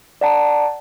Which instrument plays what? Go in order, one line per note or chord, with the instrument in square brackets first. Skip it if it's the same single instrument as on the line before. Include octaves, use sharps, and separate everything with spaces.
[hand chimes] D5 F#5 A5 A#5